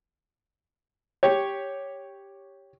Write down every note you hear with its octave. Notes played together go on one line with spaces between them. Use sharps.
G4 C#5